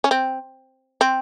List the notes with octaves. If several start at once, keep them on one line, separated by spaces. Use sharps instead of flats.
C#4
C4
C4